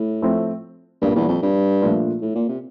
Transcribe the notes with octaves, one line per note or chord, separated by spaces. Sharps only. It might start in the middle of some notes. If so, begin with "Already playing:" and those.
Already playing: A2
F3 A3 C4
G2 A#2 G3 A#3
E2
F2
G2
A#2 F3 A3 D4 F4
A2
A#2
C3